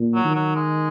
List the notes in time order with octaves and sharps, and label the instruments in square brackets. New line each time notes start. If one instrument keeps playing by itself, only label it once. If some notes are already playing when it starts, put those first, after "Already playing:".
Already playing: [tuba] A#2
[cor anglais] F#3
[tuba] D#3
[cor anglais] F#3
G#3